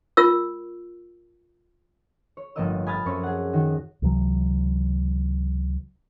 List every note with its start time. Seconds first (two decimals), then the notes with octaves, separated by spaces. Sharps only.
0.17 F4 A#4 E6
2.37 C#5
2.56 G1 A2 F3 A#3 D#5 E6
2.86 G#5 B5 D#6 F6 G6 A6
3.05 F#2 C4 C#4 A4 C#5 C#6
3.23 G#4 F#5
3.53 D#3 F#4
4.02 C#2 C3 E3 F#3